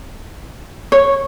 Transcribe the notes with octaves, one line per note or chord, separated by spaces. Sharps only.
C#5